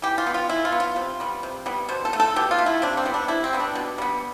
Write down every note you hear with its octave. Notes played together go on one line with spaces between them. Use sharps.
E3 G4
F4
B3
F4
E3 E4
F4
B3
F4
C3
G3 B3
C3
G3 B3
B2 C5
A4
A3
A4
B2 G4
F4
A3
E4
C3 D4
C4
G3 B3
D4
C3 E4
C4
G3 B3
D4
B2
G3 B3